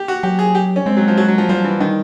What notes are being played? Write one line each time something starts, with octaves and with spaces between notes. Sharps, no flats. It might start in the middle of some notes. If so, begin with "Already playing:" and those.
Already playing: G4
F#4
F#3 G4
G#4
G4
C#4
G#3 C4
F#3
F3
F#3
F#3
F3
F3 G3
E3
D#3